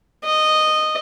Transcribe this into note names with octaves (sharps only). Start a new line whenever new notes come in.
D#5